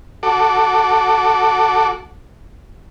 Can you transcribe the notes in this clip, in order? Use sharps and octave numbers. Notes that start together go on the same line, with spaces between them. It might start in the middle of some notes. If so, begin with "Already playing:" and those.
F#4 A4 D6